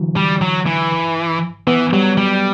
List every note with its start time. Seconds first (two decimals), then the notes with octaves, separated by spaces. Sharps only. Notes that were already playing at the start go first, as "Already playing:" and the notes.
Already playing: D3 E3 F#3
0.17 G3
0.42 F#3
0.67 E3
1.67 E3 B3
1.93 F#3 G3
2.18 F#3 G3